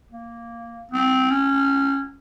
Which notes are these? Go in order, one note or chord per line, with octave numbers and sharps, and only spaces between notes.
A#3
C4
C#4